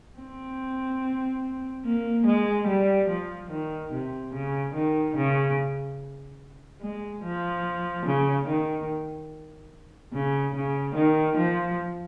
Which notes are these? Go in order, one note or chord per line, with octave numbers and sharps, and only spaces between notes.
C4
A#3
G#3
G3
F3
D#3
C3
C#3
D#3
C#3
G#3
F3
C#3
D#3
C#3
C#3
D#3
F3